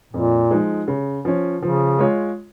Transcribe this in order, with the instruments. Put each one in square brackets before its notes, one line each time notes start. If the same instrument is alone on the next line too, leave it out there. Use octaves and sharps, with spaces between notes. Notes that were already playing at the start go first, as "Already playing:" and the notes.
[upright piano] F2 [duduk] A#2
[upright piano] F3 G#3 D#4
C#3
F3 C#4
[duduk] C#3 [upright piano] F3
[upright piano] G#3 F4 C#5